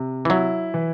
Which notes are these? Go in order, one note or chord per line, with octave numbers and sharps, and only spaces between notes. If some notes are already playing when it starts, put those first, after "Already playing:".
Already playing: C3
E3
F#3 E4
E3